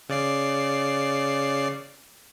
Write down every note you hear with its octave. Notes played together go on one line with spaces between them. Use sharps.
C#3 D5 C7